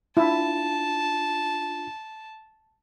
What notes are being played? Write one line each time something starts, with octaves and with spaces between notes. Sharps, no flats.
D4 E4 F4 A5